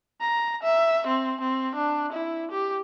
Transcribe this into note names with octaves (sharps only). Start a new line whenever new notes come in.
A#5
E5
C4
C4
D4
E4
G4